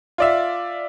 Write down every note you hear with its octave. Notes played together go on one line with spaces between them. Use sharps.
F4 D5 E5